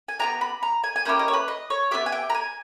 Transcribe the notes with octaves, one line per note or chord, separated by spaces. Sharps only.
G#5
B3 E4 G4 A#5
B5
A#5
G#5
G#5
A#3 C#4 E4 G4 G5
D#5
C#5
B4
D#5
C#5
B3 E4 G4 E5
G#5
G5
A#5
G#5